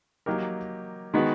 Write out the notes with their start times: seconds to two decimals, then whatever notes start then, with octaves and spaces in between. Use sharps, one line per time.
0.26 F#3 A#3 D#4 G4 A#4
1.14 D#3 G#3 B3 D#4 F#4